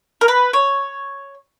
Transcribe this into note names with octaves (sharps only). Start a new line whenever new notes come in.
A#4
B4
C#5